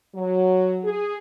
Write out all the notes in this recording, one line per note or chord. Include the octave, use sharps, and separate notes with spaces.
F#3
G#4